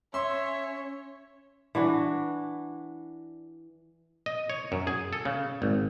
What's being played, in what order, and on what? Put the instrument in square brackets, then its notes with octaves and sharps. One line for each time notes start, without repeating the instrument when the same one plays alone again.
[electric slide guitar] C#4 [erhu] C#5 [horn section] E5 [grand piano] C6
[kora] E3 D4 F#4
[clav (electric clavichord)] D#5
C#5
F#2
G#4
A4
C#3
G#1